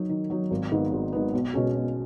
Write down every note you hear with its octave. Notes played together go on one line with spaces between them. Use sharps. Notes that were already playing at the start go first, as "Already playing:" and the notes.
Already playing: F#3 D#4
D#3
F#3 D#4
G#1
G#2 D#3 B3
G#1
G#2 D#3 B3
B1
B2 G#3 C#4 F#4
B1